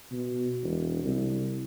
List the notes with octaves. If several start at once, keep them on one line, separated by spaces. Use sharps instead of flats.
B2
E1
C2